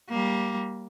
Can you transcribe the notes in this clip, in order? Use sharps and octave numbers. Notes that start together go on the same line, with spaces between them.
G3 A#3